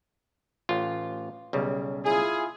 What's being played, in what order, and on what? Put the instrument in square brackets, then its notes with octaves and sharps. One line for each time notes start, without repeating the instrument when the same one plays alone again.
[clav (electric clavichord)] A1 F4
B1 C#3 G3
[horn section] E4 F4 G#4